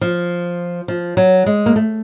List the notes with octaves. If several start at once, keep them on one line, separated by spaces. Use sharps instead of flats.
F3
F3
F#3
G#3
A#3
A3